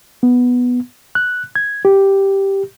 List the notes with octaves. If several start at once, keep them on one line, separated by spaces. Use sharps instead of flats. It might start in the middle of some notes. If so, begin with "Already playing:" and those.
B3
F#6
G#6
G4